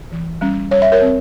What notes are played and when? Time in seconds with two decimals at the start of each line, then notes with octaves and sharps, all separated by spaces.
0.11 E3
0.41 G3 C#4
0.71 G3 C#5
0.82 E5
0.92 A#4 C#5
1.01 C4